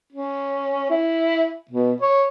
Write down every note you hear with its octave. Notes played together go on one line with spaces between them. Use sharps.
C#4
E4
B2
C#5